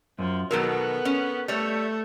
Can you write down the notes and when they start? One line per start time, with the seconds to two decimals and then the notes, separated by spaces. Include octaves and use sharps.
0.19 F#2 F3
0.51 B2 D#3 F#3 B3 A4 A#4
1.05 C#4
1.48 G3 A3 C#5